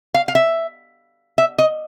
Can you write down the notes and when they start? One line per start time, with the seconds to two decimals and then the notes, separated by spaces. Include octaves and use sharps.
0.14 F5
0.28 F5
0.35 E5
1.38 E5
1.58 D#5